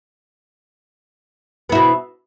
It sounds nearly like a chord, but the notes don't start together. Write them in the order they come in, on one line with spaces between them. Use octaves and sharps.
B3 E4 B2